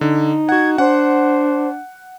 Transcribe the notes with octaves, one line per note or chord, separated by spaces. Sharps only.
D3 D#4
F#4 F#5 G#6
D4 C5 F#5